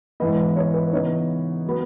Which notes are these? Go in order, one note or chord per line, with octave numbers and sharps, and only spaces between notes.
G#2 E3 B3 D#5
C#5
B4
C#3 E3 B3 D#4 C#5
F#3 B3